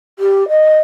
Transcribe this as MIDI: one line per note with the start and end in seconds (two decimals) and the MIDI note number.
0.19 0.47 67
0.49 0.78 75